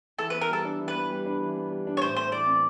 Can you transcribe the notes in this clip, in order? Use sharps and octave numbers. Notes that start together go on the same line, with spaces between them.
E3 A4
B4
B3
A#4
G3 A4
D4
E3
B4
B3
G3
D4
E3
B3
G3
D4
C#5
A2 C5
A3 C5
E3 D5
C4